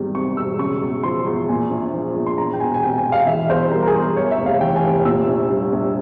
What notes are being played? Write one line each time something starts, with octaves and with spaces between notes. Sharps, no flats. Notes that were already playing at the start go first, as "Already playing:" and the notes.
Already playing: G#1 E2 G3
C3 C#6
E1 E6
C#3 C#6
E2
F3 C6
E2
A#2 G#5
A#1
F3
A#1
C6
E2 A#5
G5
E1 G#5
G#5
C3 G5
G#5
E1
F5
E3 E5
E2 C5
G3 A#4
A#4
G#4
E2
A#4
E2 C#5
E5
F1
F5
E3 G5
G#5
F1
A#2 E6
A#1
G3
A#1